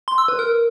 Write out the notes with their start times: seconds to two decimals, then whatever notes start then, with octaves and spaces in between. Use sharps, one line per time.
0.08 C6
0.18 E6
0.28 B4
0.39 A#4